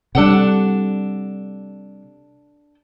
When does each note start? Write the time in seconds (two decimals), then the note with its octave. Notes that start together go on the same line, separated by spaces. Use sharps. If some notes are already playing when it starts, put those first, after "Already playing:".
0.15 C3 G3 D4 A4 F#5